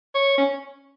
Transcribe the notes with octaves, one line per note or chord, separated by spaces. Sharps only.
C#5
C#4